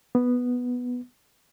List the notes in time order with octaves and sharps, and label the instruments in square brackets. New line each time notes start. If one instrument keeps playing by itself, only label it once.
[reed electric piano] B3